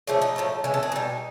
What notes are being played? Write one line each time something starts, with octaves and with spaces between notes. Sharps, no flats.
C#3 F3 A3 D4
D#4
A2 F3 A3
C#3 E3 G#3
A4
G#4
B2 G3 D#4